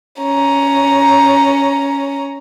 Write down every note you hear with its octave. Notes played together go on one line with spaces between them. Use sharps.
C#4 A#5